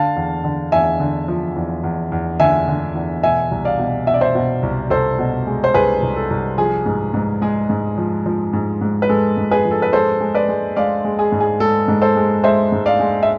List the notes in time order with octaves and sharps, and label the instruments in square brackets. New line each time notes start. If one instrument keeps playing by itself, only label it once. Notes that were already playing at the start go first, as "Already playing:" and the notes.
Already playing: [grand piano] D3 F5 A5
E2
D3
E2 E5 G#5
D3
F3
E2
E2
E2
D3 E5 G#5
D3
E2
B2 E5 G#5
C2
D5 F5
B2
B2 E5
D5
C5 E5
B2
C2
C2 A4 C5
B2
G#3
C5
C2 G#4 B4
C2
A4
C2
F3 G#4
G#2
G#2
G#3 G#4
G#2
F3
F3
G#2
G#2
B4
G#3 A4
G#2
G#4 B4
F3
A4
B4
G#3 A4 C5
G#3
B4 D5
G#3
G#3 D5 F5
G#3
G#4
G#2
G#4
G#3 A4
G#2
A4 C5
G#3
G#3 C5 E5
G#2
D5 F5
G#3
E5